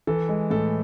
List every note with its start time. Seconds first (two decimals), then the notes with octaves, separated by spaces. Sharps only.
0.07 E3 A4
0.29 G#3
0.50 A2 A4